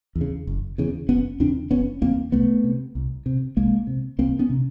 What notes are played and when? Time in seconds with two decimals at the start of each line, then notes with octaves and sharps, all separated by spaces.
0.16 E2
0.21 C#3
0.47 F#1
0.78 E2 C#3
1.09 F#1 B3 C#4
1.40 E2 C#3 C4 D4
1.71 F#1 B3 C#4
2.02 E2 C#3 A#3 C4
2.32 C2 A3 B3
2.64 C3
2.95 C2
3.26 C3
3.57 C2 G#3 A#3
3.87 C3
4.18 C2 A#3 C4
4.39 B3 C#4
4.49 C3